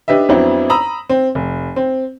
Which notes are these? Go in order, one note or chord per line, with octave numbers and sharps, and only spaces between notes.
D4 G4 B4 D#5 E5
F2 F#3 B3 C4 D4 E4
A#5 B5 D#6 E6
C4
F1
C4